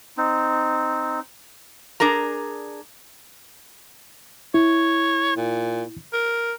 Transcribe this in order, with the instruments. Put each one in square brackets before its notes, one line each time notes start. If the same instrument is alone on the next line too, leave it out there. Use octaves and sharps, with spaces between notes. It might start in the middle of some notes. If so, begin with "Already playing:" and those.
[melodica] C4 D#4
[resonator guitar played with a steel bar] D4 G#4 A#4 A#5
[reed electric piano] E4 [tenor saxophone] C#5
[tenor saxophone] A#2
A#4